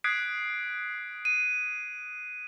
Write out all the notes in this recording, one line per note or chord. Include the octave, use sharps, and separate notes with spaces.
D#6 F#6 G#6 B6 C7 D7
D#7